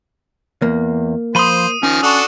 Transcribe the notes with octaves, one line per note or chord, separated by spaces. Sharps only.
E2 A#3
F3 C5 B5 C6 D#6 D#7
D#3 F3 C#4 F6
D4 F#4 A4 C#6 D#6